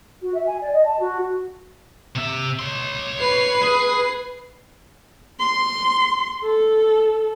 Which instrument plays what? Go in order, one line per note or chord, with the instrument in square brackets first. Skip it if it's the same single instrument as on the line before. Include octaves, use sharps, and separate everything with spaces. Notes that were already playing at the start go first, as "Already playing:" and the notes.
[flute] F#4
E5
G#5
D5
D#5
A5
F#4
[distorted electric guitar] C3 E5
C#5 C6
[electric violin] B4 C7
[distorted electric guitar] G#4
[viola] C6
A4